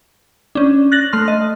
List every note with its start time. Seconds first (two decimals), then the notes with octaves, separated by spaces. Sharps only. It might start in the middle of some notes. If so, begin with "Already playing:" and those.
0.55 C#4 D4
0.92 F#6 A6 A#6 F#7
1.13 A3 C6 F6
1.28 D#5